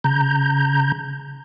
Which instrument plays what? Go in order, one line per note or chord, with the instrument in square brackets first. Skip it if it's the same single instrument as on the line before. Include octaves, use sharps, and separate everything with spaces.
[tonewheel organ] C#3 A#5 G6